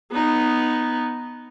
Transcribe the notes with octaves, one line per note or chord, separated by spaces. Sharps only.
B3 D#4